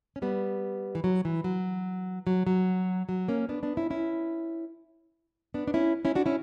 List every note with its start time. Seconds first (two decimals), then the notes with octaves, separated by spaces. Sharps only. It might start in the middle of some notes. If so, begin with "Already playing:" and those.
0.16 C#4
0.22 G3 B3
0.95 E3
1.04 F#3
1.25 E3
1.44 F#3
2.27 F#3
2.47 F#3
3.09 F#3
3.28 A#3 C#4
3.49 B3 D4
3.63 B3 D4
3.77 C#4 E4
3.90 C#4 E4
5.54 B3 D4
5.67 D4
5.74 C#4 E4
6.05 C#4 E4
6.15 D4 F#4
6.26 C#4 E4